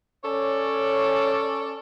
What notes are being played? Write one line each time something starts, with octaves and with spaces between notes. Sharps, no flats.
C#4 A4 C#5 D5